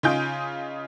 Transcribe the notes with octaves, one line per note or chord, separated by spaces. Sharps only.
C#3 D#4 F4 G#5 G6 D7